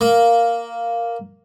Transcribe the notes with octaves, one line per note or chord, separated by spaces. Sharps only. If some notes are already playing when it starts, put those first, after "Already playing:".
A#3